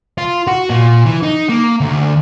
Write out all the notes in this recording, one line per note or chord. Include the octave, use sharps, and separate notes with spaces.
F4
F#4
A#2
E3
D#4
A#3
D2